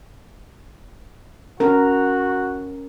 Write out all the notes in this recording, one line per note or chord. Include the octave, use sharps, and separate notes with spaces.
C#4 F#4 A#4